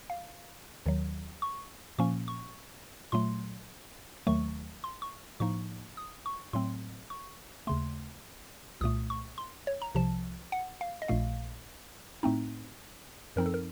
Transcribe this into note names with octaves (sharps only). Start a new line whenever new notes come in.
F5
D#2 D#3 F#3
C#6
A#2 F3 A#3 C#4 C#6
C#6
A#2 F#3 A3 C6
D#2 D#3 F#3 A3 C#6
C6
C#6
A2 F3 A#3 D#4 C#6
D#6
C#6
A2 F#3 A3 C4 C6
C#6
D#2 C#3 A3 C6
C2 A#2 A3 D#6
C#6
C6
C#5
A#5
C2 C3 F3 A5
F#5
F5
D#5
A#1 A#2 A3 F5
A2 A3 C4 D#4
F#2 F3 C4 D#4 A#4
A4
A#4